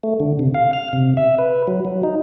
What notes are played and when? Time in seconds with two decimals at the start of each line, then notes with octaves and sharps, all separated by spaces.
0.03 A3
0.20 D3
0.39 C3
0.54 F5
0.73 F6
0.93 C3
1.17 E5
1.38 B4
1.67 F#3
1.85 F#3
2.03 D#4